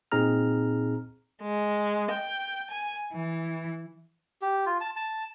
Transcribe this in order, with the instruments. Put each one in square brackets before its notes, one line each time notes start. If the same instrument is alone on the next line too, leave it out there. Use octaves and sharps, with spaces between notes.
[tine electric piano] A#2 C4 D#4 G#4 A#5 F6
[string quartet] G#3
G5
G#5
E3
[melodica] G4
F4
A5
A5